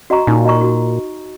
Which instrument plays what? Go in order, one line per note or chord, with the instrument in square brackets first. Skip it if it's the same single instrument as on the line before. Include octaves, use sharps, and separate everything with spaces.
[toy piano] F#4 D#5 A#5 C#6
[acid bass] A#2 [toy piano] D#4
[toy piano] F#4 D#5 A#5 C#6
F#4